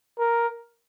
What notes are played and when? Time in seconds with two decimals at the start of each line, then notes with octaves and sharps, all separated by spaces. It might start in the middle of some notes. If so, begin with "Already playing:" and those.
0.19 A#4